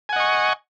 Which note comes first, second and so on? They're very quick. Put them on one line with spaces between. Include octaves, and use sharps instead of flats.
G#5 F#5 D#5 C#6